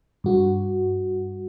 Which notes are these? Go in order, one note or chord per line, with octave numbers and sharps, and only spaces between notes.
G2 F#4